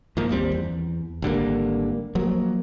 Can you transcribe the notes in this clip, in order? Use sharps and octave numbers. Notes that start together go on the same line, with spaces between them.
G#2 F3 A#3
G1 D#2 G3 C4
E2
G#1 D3 G3 A#3
F3 F#3 A#3